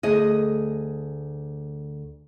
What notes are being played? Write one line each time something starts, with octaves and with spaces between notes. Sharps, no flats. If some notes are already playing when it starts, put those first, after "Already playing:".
D2 G#4 D#5